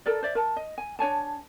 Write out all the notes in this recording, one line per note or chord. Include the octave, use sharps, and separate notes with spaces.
A4 A#4 D5
C5 D5 E5
A#4 A5
D#5
G#5
D4 C#5 G#5 A5